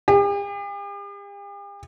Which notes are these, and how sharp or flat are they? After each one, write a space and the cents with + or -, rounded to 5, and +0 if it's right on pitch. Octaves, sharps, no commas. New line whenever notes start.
G4 +45